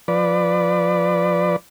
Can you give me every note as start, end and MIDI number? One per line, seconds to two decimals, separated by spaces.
0.08 1.56 53
0.08 1.56 71
0.08 1.56 74